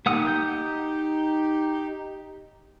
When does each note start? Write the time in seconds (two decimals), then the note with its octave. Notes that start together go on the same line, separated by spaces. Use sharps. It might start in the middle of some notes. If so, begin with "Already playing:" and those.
0.06 A#3 D#4 G4 F#5 D#6
0.27 G6